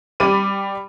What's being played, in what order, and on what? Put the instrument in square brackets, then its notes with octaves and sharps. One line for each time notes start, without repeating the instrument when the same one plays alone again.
[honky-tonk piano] G3 B5 D6 D#7